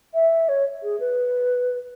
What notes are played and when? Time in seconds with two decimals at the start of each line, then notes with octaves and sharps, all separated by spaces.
0.14 E5
0.49 C#5
0.83 G#4
1.00 B4